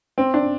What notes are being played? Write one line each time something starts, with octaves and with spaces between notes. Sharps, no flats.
C4
D4